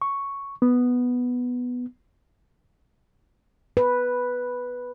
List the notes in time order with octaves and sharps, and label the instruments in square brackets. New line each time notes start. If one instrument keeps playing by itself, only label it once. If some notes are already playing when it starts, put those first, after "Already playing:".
[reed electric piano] C#6
B3
[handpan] B4